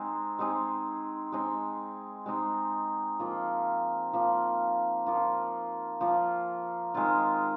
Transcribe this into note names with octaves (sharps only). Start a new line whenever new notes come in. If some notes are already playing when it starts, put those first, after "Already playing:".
Already playing: G#3 C4 D#4 G#4
G#3 C4 D#4 G#4
G#3 C4 D#4 G#4
G#3 C4 D#4 G#4
F3 A#3 F4
F3 A#3 F4
F3 A#3 F4
F3 A#3 F4
D#3 G#3 C4 F4